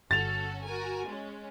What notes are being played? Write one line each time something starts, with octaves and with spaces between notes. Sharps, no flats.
G1 C#4 F#4 A4 A6 F7
F#4 A#4 G#5
G#3 C#4